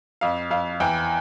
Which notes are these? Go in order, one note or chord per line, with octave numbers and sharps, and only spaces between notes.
F2 F5
F2 F5
E2 G5